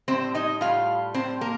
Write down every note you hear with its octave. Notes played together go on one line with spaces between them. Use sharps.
A2 G3 C4 C5
D#4 D#5
A2 G3 F4 F5
A2 G3 C4 C5
A#3 A#4